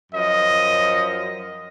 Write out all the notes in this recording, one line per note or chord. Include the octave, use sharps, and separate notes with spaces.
F#2 F3 D#5